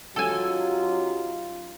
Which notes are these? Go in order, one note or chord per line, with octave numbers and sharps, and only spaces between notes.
F#3 C#4 D#4 F4 G4 A4 G#5